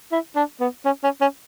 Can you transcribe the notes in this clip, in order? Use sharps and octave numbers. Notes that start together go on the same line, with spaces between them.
E4
D4
B3
C#4
C#4
C#4